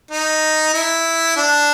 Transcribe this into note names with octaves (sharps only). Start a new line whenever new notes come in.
D#4
E4
D4